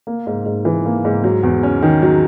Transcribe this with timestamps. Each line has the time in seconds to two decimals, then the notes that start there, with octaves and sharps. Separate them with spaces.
0.07 A#3
0.27 G#2
0.46 G#2
0.65 E3
0.86 A#3
1.05 G#2
1.24 F#3
1.43 E2
1.63 C#4
1.82 D#3
2.02 F#3